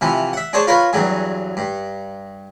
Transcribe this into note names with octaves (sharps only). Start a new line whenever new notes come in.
C3 E3 F3
E5 F#5
D4 G#4 C5 C#5 A5
F4 A#4 B4 C#5
E2 G2 F#3 G#4
G2